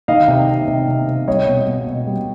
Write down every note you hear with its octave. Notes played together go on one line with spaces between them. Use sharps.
D#3 D#5 F5
C3
C3
C3
C3
C3
G3 C#5 D#5
B2
B2
B2
G3